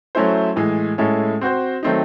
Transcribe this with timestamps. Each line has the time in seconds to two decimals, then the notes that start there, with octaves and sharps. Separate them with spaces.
0.15 F#3 A3 C#4 E4 C5
0.56 A2 E3 G#3
0.98 A2 G#3 C#4 E4 A4
1.41 C4 F#4 C5
1.83 D#3 F#3 A3 C4 D#4